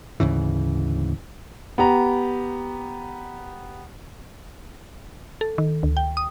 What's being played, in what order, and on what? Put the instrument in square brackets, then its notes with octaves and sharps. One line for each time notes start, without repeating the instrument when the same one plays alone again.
[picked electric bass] D2 G#2 C#3 E3
[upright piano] B3 G4 A#5
[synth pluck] A4
D#3
D2
G5
D#6